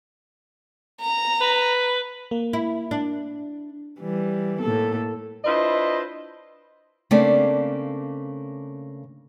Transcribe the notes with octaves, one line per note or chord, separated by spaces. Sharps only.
A#5
B4
A#3
E4
D4
E3 G3
A2 A#3 A4
D4 E4 F4 B4 C5 D#5
C#3 A3 A#3 C4 D4 D5